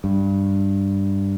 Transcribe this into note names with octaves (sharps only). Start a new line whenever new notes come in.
G2